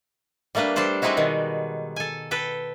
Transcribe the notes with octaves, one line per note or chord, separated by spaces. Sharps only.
G3 A3 A#3 D4 B4
G3 D4 A4 C5 D5
G3 G#3 C4 D#4 E4 F#4
B2 D#3
A4 G#5
A4 B4 G5